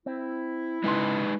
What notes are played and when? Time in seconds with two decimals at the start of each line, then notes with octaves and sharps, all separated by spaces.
0.06 C4 E4
0.84 G#2 C#3 G#3 D#4 B4 C6